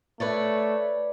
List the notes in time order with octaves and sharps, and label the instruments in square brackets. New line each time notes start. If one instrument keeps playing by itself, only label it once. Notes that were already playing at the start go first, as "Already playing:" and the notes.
[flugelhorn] A3 [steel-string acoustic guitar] B4 C#5 D5